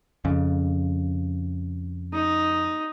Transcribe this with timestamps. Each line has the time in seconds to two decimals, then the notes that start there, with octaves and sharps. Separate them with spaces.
0.25 F2 C#3
2.13 D#4